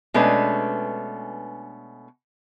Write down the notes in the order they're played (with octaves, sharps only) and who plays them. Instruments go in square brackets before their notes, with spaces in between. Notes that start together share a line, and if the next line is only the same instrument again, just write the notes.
[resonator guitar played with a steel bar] B2 G#3 A3 C#4 D4 B4